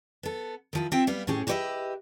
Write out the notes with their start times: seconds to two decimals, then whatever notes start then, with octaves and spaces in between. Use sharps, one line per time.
0.23 B3 A4
0.73 D#3 F3 E4
0.92 C4 F4 E5 G5
1.07 G3 B3 F5
1.27 A2 C#4 G4 G#4
1.47 F#4 G4 B4 C#5 D#5 E5